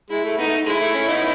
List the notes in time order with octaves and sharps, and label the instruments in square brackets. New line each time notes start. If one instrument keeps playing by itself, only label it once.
[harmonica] G#3 [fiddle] E4
[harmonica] A3
[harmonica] B3 [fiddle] D#4
[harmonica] A3
[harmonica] G#3 [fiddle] E4
[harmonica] A3
C#4
B3 D#4